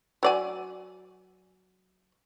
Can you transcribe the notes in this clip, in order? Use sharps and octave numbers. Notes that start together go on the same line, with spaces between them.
F#3 D5 G#5